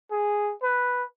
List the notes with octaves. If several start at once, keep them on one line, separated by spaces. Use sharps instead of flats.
G#4
B4